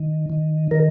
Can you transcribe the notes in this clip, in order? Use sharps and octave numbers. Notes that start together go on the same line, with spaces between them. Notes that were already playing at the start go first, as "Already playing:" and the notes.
Already playing: D#3
D#3
D#3 A#4